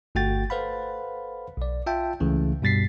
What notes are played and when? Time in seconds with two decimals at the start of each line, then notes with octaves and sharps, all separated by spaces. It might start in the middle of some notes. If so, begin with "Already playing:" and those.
0.15 G1 A3 F#4 G5 A6
0.50 A4 B4 C5 F5 F#5 B5
1.57 B1 D5
1.86 F4 E5 G5 A5
2.20 C#2 C#3 E3 A3
2.62 G2 B2 G3 A6 B6 C7